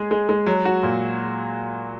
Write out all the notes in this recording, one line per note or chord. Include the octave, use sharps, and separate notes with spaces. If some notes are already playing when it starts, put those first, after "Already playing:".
Already playing: G#3 G#4
G#3
G#3
F#3
F#4
A#2